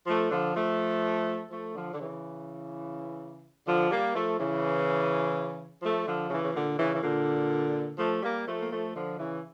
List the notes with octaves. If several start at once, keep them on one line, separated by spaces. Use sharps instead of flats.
F3 A3
D3 F3
F3 A3
F3 A3
D3 F3
D3
C#3 E3
D3 F3
G3 A#3
F3 A3
C#3 E3
F3 A3
D3 F3
C#3 E3
C#3
A#2 D3
C#3 E3
E3
A#2 D3
F3 A3
G3 A#3
F3 A3
A#3
F3 A3
D3 F3
C#3 E3